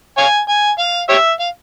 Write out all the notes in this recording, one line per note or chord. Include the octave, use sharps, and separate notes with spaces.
C#5 F5 G#5
G#5
F5
G4 C#5 E5
F5